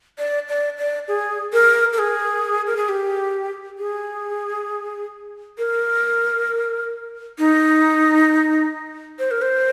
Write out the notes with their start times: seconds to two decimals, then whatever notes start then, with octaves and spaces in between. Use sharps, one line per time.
0.18 D5
0.49 D5
0.78 D5
1.08 G#4
1.53 A#4
1.93 A#4
1.98 G#4
2.67 A#4
2.77 G#4
2.89 G4
3.79 G#4
5.58 A#4
7.39 D#4
9.19 C5
9.31 A#4
9.42 C5